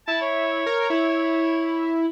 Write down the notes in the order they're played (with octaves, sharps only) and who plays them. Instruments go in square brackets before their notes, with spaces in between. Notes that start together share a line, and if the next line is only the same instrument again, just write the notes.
[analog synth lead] E4 [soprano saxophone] A5
[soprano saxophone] C#5
[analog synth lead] A#4
E4